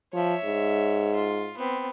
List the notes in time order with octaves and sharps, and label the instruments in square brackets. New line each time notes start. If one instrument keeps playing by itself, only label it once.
[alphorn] F3 [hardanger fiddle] C#5 E5
[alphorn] G#2
[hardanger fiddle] F4
B3 C4